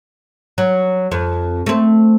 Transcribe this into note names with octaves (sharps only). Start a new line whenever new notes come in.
F#3
F2
A3 C4